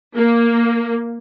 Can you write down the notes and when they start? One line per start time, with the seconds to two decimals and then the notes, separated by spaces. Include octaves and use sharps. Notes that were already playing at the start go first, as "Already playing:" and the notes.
0.16 A#3